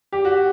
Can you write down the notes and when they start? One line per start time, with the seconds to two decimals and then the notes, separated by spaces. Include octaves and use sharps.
0.12 G4
0.25 F#4